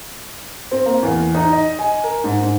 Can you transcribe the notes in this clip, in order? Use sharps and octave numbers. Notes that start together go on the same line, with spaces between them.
C4
A#3
E2
D#4
D#5
G#5
A#4
G#2
G#2